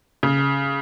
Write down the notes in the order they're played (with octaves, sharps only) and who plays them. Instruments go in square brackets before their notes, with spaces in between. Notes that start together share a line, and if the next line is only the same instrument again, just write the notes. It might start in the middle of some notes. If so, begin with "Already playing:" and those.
[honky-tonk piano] C#3